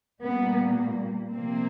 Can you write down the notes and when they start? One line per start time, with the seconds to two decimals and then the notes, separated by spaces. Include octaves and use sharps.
0.22 A#2 G3 A#3 B3
1.33 C3 F3 A#3 C4